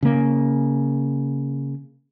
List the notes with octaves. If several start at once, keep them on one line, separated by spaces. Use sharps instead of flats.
C#3 A#3